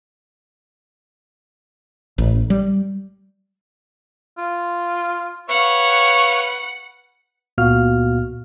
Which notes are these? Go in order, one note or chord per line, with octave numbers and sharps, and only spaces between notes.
A1
G3
F4
B4 C#5 F5 F#5
C#2 A#2 B3 F#4 F5 F6